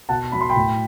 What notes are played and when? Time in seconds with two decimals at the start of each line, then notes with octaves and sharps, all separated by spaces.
0.09 B2 F#5 A5
0.32 F#3 B5
0.41 C6
0.49 G5 B5
0.56 A2